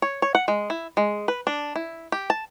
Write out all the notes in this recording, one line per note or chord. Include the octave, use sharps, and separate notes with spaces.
C#5
C#5
F#5
G#3
E4
G#3
B4
D4
E4
G4
A5